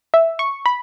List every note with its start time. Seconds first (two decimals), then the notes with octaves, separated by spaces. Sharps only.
0.14 E5
0.39 C#6
0.66 B5